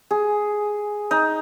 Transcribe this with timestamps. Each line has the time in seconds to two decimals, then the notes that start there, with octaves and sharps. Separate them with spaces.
0.11 G#4
1.11 D#4